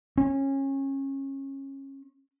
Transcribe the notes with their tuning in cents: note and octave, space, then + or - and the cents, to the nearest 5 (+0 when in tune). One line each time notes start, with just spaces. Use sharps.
C#4 -25